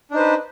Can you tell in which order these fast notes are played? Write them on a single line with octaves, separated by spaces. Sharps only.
D4 D#4 C5 B4